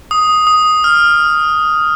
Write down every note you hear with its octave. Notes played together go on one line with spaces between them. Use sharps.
D#6
D#6
F6